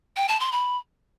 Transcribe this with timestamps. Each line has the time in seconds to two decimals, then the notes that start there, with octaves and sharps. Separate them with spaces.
0.16 G5
0.28 A5
0.40 C6
0.52 B5